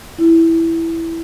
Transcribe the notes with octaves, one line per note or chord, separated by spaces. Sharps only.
E4